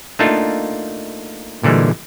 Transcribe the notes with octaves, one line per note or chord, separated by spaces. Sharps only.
A3 A#3 D4 D#4 F4
A#2 D3 E3 G3 G#3